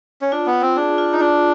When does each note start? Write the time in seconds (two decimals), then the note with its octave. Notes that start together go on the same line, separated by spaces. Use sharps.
0.21 C#4
0.32 D4 F4
0.46 B3
0.53 F4
0.61 C4
0.76 D4 G#4
0.98 F4
1.13 D#4
1.20 D4 F4